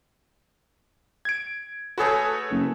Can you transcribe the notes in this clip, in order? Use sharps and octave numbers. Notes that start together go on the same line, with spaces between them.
G#6 D7
A3 F#4 G#4 A4 B4 C#5
F#1